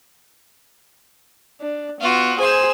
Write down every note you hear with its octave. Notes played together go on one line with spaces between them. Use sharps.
D4
B3 F4 F#4
G#4 C5 G#5 E6